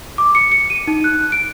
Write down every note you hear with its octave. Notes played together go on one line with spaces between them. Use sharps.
D6
C#7
C#7
D#7
D#4
F#6
D7